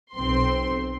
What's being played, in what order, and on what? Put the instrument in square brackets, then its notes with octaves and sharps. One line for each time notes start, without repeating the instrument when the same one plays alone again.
[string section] B1 C4 C6